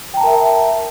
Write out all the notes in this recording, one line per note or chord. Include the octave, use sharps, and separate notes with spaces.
A#4 E5 G5 A5 A#5